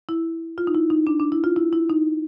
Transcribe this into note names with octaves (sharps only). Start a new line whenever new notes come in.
E4
F4
D#4
E4
D#4
D4
D4
E4
F4
E4
E4
D#4